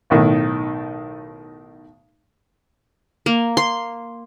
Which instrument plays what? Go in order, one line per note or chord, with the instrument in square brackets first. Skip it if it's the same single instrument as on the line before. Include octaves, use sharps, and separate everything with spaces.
[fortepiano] B1 A2 D#3
[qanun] A#3
C6